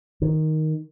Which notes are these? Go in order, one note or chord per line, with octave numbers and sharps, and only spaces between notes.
D#3